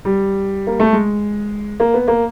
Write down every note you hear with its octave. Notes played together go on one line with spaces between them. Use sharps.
G3
A#3
A3
G#3
A#3
B3
A#3